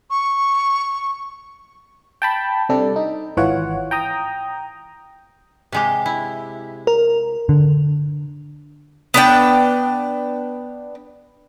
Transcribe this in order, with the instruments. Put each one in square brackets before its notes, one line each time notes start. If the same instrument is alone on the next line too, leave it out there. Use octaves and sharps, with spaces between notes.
[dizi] C#6
[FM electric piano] G5 A5 B5
C3 G3 D4 A4
D#4
G#1 E3 F4 C#5 F#5
G5 A#5 D#6
[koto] C3 G#3 G4
E4
[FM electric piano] A#4
[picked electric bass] D3
[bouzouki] B3 D4 G5